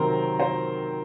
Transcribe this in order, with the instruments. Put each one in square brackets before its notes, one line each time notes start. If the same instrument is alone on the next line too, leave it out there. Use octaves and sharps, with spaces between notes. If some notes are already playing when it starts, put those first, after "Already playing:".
Already playing: [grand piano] C3 D#3 F#3 C4 [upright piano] A#4 C5
[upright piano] C5